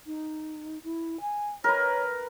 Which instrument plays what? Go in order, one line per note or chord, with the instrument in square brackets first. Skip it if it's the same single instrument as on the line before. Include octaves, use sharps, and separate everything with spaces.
[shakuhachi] D#4
E4
G#5
[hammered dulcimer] A#4 B4 [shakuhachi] C#5